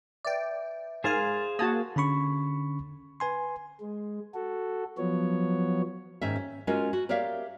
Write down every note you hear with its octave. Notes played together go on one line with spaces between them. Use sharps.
B4 D5 E5 G5
G#2 G#4 A#4 C5 F5 G#5 A6
A#3 F#4 A5 D#6 G#6
D3 C#4 B5 C#6
B4 G#5 C6
G#3
F#4 A4
F3 F#3 B3 C#5
G#2 D#3 C#4 E5
C#4
G#3 C#4 F4 F#4 A#4
F#4
G4 A#4 C#5 D5 E5 F5